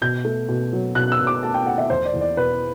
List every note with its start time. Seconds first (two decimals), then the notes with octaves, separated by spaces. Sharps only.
0.02 B2 G6
0.25 A3
0.49 B2
0.73 F#3
0.95 B2 F#6
1.12 E6
1.19 B2
1.27 D6
1.43 A3 A5
1.54 G5
1.66 A3 F#5
1.78 E5
1.90 E2 C5
2.05 D5
2.14 E2
2.21 D5
2.37 B2 B4